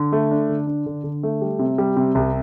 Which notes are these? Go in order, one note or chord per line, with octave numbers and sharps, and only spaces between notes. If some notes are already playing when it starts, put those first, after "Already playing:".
Already playing: D3
A3
D4
D3
D4
D3
D3
A3
G3
C3
G3
C3
C2